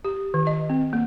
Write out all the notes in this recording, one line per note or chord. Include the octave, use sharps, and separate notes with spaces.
G4
D#3
D#5
C4
A#3